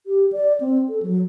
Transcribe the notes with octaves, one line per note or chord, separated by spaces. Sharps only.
G4
D5
C4
A4
F#3